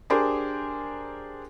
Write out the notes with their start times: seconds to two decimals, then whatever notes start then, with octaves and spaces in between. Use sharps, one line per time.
0.10 D4 G4 G#4 A#4 C5